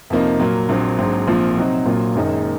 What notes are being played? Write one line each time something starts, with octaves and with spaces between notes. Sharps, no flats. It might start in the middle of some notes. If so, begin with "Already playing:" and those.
F2 C3 F3 A#3 D#4
A#2 F#3 A#3
A#1 A#2 F#3 C4
A#1 G#2 F#3 C4
A#1 A#2 F3 C4 F4
C3 F#3 C4 D#4 F#4
A#1 A#2 F#3 A#3 F4
F#1 F#2 D#3 G#3 D#4